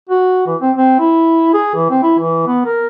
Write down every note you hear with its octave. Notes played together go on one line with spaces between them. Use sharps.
F#4
E3
C4
C4
E4
G#4
E3
C4
E4
E3
B3
A#4